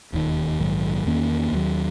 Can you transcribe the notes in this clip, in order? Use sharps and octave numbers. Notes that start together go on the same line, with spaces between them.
E1 D#2 D#3
A#1 G#2 D#3 F#3
E2 D#3 A#3 C#4
D#2 D#3 F#3